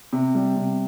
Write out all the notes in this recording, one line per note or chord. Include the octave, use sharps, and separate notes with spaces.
C3
G3
C3